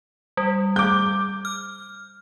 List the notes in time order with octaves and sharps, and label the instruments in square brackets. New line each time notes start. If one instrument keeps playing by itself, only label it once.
[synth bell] G3
[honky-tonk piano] D6 G6
[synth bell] F6